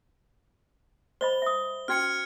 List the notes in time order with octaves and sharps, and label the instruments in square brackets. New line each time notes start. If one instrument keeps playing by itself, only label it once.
[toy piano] C5 D#5 B5 [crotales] G7
[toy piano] E5 D#6
[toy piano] C#4 F#4 G5 [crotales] F6 G#6 C#7